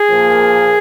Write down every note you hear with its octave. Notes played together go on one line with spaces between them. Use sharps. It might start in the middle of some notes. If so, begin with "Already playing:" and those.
Already playing: G#4
A#2 F3 A#3